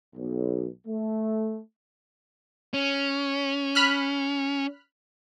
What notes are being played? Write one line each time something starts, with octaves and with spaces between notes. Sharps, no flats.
B1
A3
C#4
B5 F6 F#6